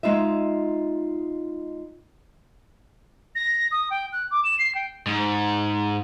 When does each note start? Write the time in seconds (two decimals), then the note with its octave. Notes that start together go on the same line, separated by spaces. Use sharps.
0.03 G#3 D#4 F4 D#5 E5
3.35 A#6
3.71 D#6
3.90 G5
4.13 F#6
4.31 D6
4.44 E7
4.59 C7
4.75 G5
5.07 G#2